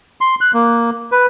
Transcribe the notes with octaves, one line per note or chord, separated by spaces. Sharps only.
C6
F#6
A#3
B4